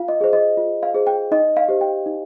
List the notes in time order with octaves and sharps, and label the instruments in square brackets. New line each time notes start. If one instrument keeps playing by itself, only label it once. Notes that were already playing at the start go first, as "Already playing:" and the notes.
Already playing: [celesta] F4 F5
D#5
G#4 C5
D#5
F4
F5
G#4 C5
G5
D#4 D#5
F5
G4 C5
G5
D#4